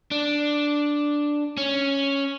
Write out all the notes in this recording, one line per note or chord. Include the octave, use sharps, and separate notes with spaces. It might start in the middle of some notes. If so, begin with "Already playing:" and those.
D4
C#4